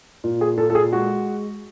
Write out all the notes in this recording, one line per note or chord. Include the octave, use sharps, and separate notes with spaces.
A#2
G#4
A#2 A4
A4
G#4
G#3 F#4